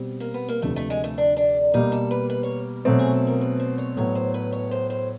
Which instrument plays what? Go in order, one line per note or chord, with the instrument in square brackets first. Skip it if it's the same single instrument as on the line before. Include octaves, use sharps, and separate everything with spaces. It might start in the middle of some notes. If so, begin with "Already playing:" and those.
Already playing: [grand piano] B2 G3 C4
[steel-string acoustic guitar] A#3
B3
A#3
[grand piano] D2 C3 F3 [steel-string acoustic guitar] A3
[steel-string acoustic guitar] A3
G#3
A3
D4
D4
[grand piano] B2 G3 A#3 [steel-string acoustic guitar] D#4
[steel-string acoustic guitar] A4
B4
B4
C#5
[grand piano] B2 F#3 A3 C4
[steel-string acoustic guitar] G#4
A4
A#4
B4
C5
C#5
[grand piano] A2 F#3 B3 [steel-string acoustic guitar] C#5
[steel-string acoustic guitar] C5
B4
C#5
C5
C5